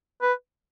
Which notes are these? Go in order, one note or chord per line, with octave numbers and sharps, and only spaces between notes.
B4